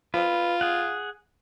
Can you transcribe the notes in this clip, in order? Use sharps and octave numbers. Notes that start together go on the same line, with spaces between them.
F4 B4
G#4 F#5